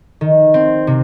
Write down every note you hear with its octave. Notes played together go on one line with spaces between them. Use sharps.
D#3
C4
C3